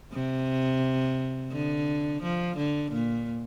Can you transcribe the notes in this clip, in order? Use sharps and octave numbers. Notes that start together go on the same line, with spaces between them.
C3
D3
F3
D3
A#2